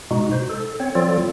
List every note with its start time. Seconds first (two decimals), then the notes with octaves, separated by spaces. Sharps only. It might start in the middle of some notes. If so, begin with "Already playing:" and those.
0.11 B2 G#3 D#4 F#4
0.32 C5
0.50 A4
0.80 C4 C#5
0.95 F3 F#3 C4 F4 A4 D5